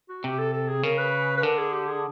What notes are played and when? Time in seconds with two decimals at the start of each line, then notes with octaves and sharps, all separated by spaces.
0.09 F#4
0.24 C3 G4
0.38 A4
0.53 A4
0.68 G#4
0.83 C#3 A#4
0.98 B4
1.37 B4
1.43 D3 A#4
1.57 G#4
1.72 G4
1.87 G#4